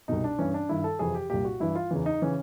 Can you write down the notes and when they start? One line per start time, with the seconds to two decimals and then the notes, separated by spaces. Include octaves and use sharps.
0.08 C2 B2 D#4
0.24 D4
0.39 G2 E3 C#4
0.54 D4
0.69 G2 D#3 E4
0.84 A4
0.99 F2 C3 E3 G#4
1.15 G4
1.30 C2 A#2 G4
1.45 F#4
1.60 G2 E3 E4
1.76 F4
1.91 E2 C#3 E3
2.06 D#4
2.22 C#3 E3 C#4